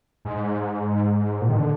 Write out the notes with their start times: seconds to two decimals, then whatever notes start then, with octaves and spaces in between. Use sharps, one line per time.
0.25 G#2
1.41 A#2
1.49 D#3
1.55 D3